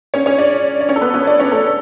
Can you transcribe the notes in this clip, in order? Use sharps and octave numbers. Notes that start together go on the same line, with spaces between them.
C#4 C#5
C#4 C#5
D4 D5
D5
C#4 C#5
A4
B3 B4
C#4 C#5
D4 D5
C#4 C#5
A3 A4